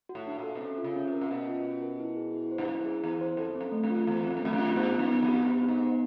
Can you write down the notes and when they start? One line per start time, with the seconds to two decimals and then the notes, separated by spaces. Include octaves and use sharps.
0.09 F#4
0.15 A2
0.27 D4
0.38 A#2
0.44 A4
0.55 B2
0.60 C3 C#4
0.78 F4
0.84 C#3
0.96 C#4
1.07 C3
1.13 A#4
1.21 A#2
1.31 B2 C#4
1.48 F4
1.65 C#4
1.82 A#4
2.00 E4
2.16 G#4
2.34 E4
2.51 C5
2.58 G2
2.68 F#2 E4
2.85 G#4
3.04 E2 E4
3.21 C5
3.37 F2 A4
3.55 C4
3.61 F#2
3.72 A3
3.83 F#2
3.90 F4
4.07 E2 A4
4.24 C4
4.31 F2
4.37 F#2
4.42 F2 A3
4.53 F#2
4.59 F4
4.76 G2 B3
4.94 D#4
4.99 F#2
5.10 B3
5.23 F2
5.28 G4
5.45 G2 B3
5.62 D#4
5.68 G#2
5.80 B3